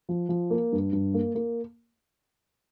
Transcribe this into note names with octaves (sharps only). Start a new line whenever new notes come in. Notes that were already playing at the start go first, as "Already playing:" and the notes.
F3
F3
A#3
G2
G2
A#3
A#3